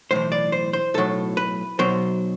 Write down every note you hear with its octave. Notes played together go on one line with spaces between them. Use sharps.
B1 A2 E3 C5
D5
C5
C5
B1 A2 F#3 A4
B4
B1 B2 F#3 C5